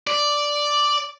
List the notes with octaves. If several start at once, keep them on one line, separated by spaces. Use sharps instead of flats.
D5